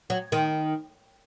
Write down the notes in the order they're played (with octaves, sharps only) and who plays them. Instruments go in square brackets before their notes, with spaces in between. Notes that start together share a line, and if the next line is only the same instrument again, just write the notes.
[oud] F#3
D#3